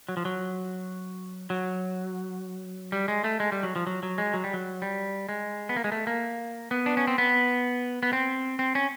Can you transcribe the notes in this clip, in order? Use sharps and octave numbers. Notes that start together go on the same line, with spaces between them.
F#3
F3
F#3
F#3
G3
G#3
A3
G#3
G3
F#3
F3
F#3
F#3
G#3
F#3
G3
F#3
G3
G#3
B3
A#3
G#3
A3
A#3
B3
D4
C#4
C4
B3
B3
C4
C4
C#4